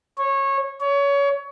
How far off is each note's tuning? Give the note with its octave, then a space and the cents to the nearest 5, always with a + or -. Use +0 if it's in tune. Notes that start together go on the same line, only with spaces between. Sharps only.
C#5 -20
C#5 +25